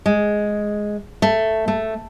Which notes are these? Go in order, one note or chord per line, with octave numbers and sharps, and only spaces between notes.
G#3
A3
A3